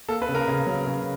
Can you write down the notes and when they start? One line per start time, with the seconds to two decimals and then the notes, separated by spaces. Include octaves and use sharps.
0.09 A#3 A4
0.22 B4
0.28 C#3
0.35 A#4
0.48 C#3
0.67 F#3
0.87 C#3